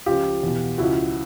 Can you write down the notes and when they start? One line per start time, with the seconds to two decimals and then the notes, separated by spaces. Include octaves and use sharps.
0.06 C#2 C#3 F3 F4 G4
0.43 E2 B2
0.78 C#2 C#3 F3 E4 F#4